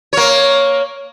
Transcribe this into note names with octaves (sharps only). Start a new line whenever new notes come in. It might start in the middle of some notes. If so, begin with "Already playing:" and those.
A#3 C#5